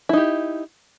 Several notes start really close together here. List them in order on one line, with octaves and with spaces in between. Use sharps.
E4 D#4 G4